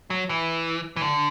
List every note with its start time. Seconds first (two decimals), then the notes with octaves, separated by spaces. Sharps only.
0.10 F#3
0.29 E3
0.96 E3
1.01 D3